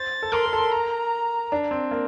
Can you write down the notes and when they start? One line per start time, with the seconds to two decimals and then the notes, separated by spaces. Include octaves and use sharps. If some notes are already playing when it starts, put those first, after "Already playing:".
Already playing: C5 A6
0.23 A4
0.32 A#4 C6
0.45 A#4
0.53 A4
0.58 A#4
0.72 A#5
1.52 D4
1.71 C4
1.91 A#3